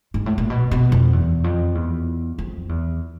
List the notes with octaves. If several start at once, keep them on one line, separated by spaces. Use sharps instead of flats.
G#2
A2
A#2
B2
B2
F2
E2
F2
E2
F2
E2